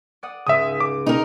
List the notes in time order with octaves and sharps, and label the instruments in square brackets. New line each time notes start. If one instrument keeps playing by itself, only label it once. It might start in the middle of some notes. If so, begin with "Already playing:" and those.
[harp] D5 F#5 D#6
[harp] C#2 G#2 C#3 [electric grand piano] E5 D#6
[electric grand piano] D6
[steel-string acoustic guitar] D#4 A#4